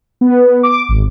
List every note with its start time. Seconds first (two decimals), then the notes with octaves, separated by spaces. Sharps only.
0.21 B3
0.63 D6
0.89 G#1